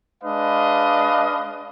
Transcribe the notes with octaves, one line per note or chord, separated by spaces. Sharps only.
G#3 D4 B4 D#5 F5